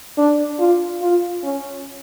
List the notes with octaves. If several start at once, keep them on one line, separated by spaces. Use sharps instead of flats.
D4
F4
F4
C#4